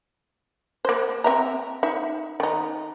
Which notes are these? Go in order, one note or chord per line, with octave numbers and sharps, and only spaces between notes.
A#3 C5
C4 E5 A#5
D#4 E5
D#3 D#4